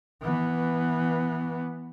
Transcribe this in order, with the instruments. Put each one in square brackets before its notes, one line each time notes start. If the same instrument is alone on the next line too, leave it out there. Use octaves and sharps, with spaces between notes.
[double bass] E3 B3